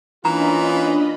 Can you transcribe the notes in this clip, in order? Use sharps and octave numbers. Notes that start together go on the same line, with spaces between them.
E3 A#3 C#4 D4 F4 D#5 A#5 B5